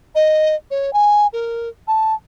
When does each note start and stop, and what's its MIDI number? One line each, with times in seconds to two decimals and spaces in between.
0.15 0.55 75
0.71 0.93 73
0.93 1.27 80
1.33 1.69 70
1.88 2.14 81